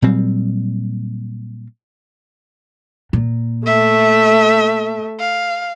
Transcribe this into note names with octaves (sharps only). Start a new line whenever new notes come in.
A#2 F#3 G3 C4
A#2
A3 E5
F5